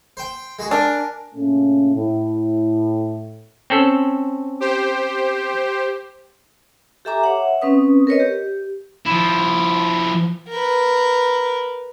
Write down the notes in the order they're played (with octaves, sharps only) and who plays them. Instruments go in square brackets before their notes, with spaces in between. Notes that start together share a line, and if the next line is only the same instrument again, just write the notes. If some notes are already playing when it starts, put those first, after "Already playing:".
[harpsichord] C5 G5
G#3 F#4 G#4
[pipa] D4 [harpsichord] A#4 G#5
[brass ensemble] A#2 C#3 A3 C#4
A2
[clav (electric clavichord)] C4 C#4 A4
[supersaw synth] G4 C5
[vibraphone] G4 A4 E5 G#5 A#5 D6
C#5 E5 F#5
C4 C#4 B4 D#6
A#4 B4 C#5 D#5
G4
[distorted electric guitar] F3 E4
[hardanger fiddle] A#4 B4